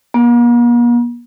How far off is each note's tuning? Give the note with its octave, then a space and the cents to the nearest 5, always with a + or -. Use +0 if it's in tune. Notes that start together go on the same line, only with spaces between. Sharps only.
A#3 +45